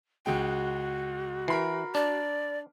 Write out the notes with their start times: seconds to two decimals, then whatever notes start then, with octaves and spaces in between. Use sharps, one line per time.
0.26 C#2 G#3 F#4 G5
1.48 E3 A#4 B5 C7
1.95 D4 D5